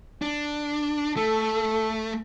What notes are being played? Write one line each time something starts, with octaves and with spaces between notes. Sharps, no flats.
D4
A3 A4